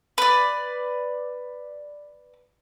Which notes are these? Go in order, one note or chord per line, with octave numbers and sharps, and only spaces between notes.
B4 D5